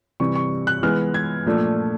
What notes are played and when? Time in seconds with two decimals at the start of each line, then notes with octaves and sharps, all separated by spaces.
0.20 C3 E3 G3 C#6
0.35 C#6
0.67 F#6
0.83 E3 G#3 B3 F6
1.14 G#6
1.46 A#2 F3 A3 D4